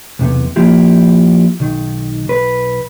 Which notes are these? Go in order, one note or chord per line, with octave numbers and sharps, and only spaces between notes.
B1 E2 C3 B3
F3 A#3 E4 F4 G4
B1 D#3
B1 B4